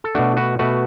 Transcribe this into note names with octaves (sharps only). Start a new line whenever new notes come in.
A4
B2 A3 D4 F#4
F#4 B4
B2 A3 F#4 B4